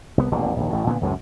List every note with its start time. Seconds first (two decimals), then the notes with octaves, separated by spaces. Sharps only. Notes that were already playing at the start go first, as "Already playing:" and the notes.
0.18 C2 B3
0.32 D#1 A1 B2 D3
0.57 A#1 D#2
0.70 A1 A2
0.87 A#2 D3 F3 B3
1.01 C#2 F#2 A2 C3